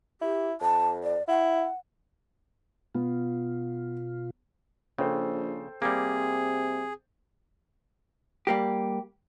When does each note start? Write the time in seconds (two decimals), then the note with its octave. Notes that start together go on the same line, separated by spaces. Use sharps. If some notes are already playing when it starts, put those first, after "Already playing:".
0.21 E4 G4
0.61 F2 A5
1.04 D5
1.28 E4 F#5
2.95 B2 B3 F4
4.98 A#1 C#3 A4 C5 G5
5.82 C3 G3 A#3 G#4
8.47 G3 A#3 G4